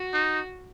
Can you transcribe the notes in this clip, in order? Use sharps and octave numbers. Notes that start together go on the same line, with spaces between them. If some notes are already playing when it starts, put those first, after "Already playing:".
Already playing: F#4
D#4